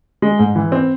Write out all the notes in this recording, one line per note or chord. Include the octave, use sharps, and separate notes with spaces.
G#3
G#2
E3
C4